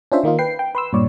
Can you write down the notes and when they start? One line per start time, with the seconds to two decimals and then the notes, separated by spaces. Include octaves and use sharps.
0.12 C#4 D4 F4 C5 E5
0.23 D#3 A#3 D#4 F4
0.39 B4 G5 C7
0.59 G5
0.75 B4 C6 E6
0.93 G2 A#2 C#5 D5